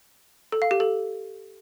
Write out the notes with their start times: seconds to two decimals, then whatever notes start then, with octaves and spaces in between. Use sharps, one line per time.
0.52 A4
0.62 F5
0.71 G4
0.80 A4